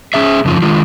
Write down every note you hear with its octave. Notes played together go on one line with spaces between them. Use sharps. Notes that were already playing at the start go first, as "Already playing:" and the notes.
C#4 G#4 E5
F#2 C#3 F3
D#3 G#3 F4